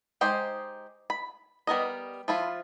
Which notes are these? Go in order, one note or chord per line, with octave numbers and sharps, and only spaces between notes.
G#3 D#4 G4 C5
B5
G3 B3 A#4 D#5
F3 E4 F4